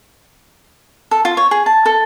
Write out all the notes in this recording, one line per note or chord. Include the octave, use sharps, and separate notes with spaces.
A4
F4
C#5
G#4
A5
A4